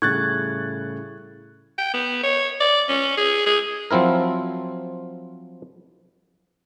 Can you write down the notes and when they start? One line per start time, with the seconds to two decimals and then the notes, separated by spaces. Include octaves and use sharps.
0.02 A2 C#3 G3 C#6 F#6 G#6 A6
1.78 G5
1.93 B3
2.23 C#5
2.60 D5
2.89 C#4
3.17 G#4
3.46 G#4
3.91 F3 F#3 C4 E4 A#4